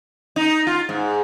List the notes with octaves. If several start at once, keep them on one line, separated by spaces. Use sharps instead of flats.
D#4
F4
G#2